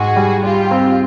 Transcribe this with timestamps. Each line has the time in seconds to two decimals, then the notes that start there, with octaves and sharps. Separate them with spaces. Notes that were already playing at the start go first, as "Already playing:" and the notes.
Already playing: G#2 F#4 G#4
0.16 G3
0.43 G3 F4 G4
0.71 C4